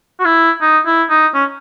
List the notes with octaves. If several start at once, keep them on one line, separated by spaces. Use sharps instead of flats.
F#4
E4
D#4
E4
D#4
C#4